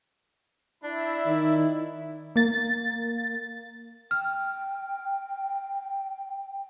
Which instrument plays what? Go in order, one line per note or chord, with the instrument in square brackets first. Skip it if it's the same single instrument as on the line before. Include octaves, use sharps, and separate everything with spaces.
[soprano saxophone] D4 [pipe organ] E4
[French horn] D#3 [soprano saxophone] D5
[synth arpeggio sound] A#3 A6
[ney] G5 [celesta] F6